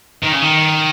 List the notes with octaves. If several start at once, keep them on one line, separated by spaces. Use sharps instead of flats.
D#3
C#3
D#3